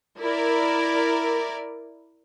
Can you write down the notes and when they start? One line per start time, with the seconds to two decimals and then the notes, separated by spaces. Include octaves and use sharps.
0.20 E4 A#4 D5